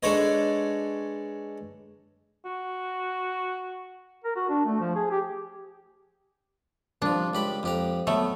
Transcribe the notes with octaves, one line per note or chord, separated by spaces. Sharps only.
G#3 D4 A4 B4 C#5 D#5
F#4
A#4
F#4
D4
A3
F3
G#4
G4
C2 F3 D4
C#2 G4 B5
F2 G4 A#5
F#3 A3 B3